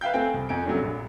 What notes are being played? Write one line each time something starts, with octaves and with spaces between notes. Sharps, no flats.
B4 E5 F5 G5 G6
A3 C4 C5 F5 G5 G#5
C2
F2 G#5 D7
C3 F#3 G3 A3 C#4 D4
A#1